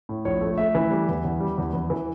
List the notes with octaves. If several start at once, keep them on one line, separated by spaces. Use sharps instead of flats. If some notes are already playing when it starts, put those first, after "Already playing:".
A2
A#1 C#5
A3
A3 E5
E3
G3
E2
E2
G3
E2
E2
E3